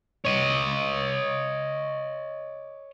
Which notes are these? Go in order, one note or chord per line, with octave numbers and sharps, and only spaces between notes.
C#5 D#5